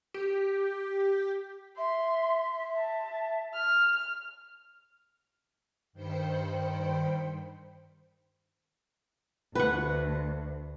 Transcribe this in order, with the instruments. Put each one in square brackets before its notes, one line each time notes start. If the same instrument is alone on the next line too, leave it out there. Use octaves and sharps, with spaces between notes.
[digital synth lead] G4
[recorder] E5 [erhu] C6
[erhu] A5
F6
[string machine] G2 D#3 C5 G5 B5 C#7
[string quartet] D2 [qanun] B4 F#5